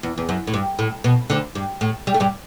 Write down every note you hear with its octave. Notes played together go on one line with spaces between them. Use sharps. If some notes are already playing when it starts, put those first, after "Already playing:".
E2
E2
F#2
A2
G2
A2
B2
D2 D3
G2
A2
G3
A3
G2 G3